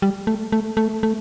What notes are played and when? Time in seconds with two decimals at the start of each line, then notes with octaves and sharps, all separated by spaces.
0.02 G3
0.27 A3
0.52 A3
0.77 A3
1.03 A3